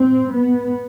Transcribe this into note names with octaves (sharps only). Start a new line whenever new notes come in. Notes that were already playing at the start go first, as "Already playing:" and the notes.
Already playing: C4
B3